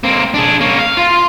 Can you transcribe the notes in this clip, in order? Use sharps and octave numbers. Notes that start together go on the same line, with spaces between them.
A#3 C4
D4 G#4
A#3 C#4
F5
F4